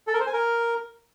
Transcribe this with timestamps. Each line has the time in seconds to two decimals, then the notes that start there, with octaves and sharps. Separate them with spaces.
0.07 A4
0.14 A#4
0.20 C5
0.26 G#5
0.33 A#4